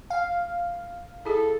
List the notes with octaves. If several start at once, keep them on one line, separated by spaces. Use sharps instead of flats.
F5
E4 G#4 A4